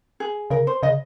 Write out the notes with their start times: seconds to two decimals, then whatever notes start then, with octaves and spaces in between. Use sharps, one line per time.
0.20 G#4
0.50 C#3 A#4
0.67 C5
0.83 C#3 D#5